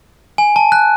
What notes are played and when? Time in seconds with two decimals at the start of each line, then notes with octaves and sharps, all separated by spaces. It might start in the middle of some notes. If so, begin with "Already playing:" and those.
0.38 G#5
0.56 A5
0.72 F#6